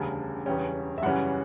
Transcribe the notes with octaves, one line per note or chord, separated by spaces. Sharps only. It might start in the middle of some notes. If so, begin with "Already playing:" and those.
Already playing: E1 D2 C#3 G3 A5
E1 E2 C#3 G3 C#4 G5
E5
F#2 C#3 E3 G3 C#4 F#5